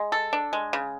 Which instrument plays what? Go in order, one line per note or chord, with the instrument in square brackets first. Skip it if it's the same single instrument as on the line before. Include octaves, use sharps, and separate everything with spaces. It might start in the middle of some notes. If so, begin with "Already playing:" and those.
Already playing: [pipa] G#3
A4
D4
G#3
C#3